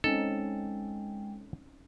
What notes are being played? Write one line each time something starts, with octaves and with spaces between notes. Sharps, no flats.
G#3 C4 C#4 D#4 A4 G5